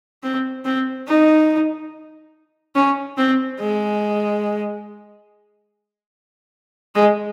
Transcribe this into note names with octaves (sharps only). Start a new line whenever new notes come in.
C4
C4
D#4
C#4
C4
G#3
G#3